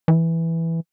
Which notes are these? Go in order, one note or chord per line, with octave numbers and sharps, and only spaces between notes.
E3